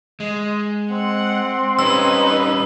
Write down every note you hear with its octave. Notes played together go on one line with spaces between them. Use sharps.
G#3
C4 F#5
G3 C#4 D#4 B4 E6